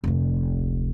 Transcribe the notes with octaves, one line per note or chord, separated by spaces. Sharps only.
F1 D2